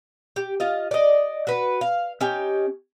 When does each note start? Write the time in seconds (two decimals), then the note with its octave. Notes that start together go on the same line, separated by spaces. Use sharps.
0.36 G4
0.60 F4 D#5
0.91 D5 D#5
1.47 F#4 B4
1.81 F5
2.21 C#4 D#4 G4